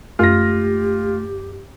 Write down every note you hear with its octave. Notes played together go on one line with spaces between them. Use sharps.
F#2 A3 F4 G4 A#6